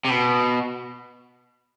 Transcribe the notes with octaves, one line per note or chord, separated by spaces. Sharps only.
C3
B2